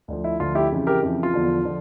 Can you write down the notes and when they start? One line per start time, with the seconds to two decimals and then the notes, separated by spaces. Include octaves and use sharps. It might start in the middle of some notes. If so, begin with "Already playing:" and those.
0.08 D2 D3 F3
0.24 E4
0.40 D2 D3 F3 F4
0.55 E4 G4
0.71 F2 C#3 E3
0.87 G4 A#4
1.03 F2 C#3 E3
1.23 F4
1.34 E2 D3 F3
1.65 D3 F3